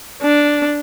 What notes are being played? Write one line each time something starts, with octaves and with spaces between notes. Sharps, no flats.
D4